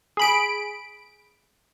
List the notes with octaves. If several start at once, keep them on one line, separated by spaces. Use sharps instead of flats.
G#4 B5 D7